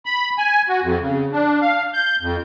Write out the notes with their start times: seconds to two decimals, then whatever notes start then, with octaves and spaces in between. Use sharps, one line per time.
0.06 B5
0.38 G#5
0.69 F#4
0.83 F2
1.01 C#3
1.32 D4
1.62 F5
1.94 G6
2.21 F2